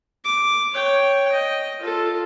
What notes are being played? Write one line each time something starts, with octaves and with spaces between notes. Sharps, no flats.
D6
C#5 G5
D#5
F4 A4